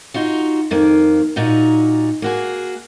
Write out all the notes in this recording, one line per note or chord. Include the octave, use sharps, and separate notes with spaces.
D#4 F4 F#4
F2 D#3 A#3
A#2 D#4 F#4
A#3 F#4 G#4